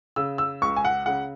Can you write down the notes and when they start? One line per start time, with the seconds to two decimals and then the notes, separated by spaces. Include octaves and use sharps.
0.16 C#3 E6
0.38 E6
0.62 C#2 C#6
0.76 G#5
0.85 F#5
1.06 C#3 F#5